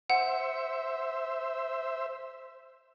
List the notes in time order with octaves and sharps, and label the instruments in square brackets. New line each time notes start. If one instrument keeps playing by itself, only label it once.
[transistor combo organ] C5 E5 [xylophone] F#5